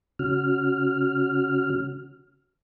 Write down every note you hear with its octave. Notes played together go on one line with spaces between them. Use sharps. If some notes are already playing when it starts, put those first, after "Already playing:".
C#3 C#4 F#4 F6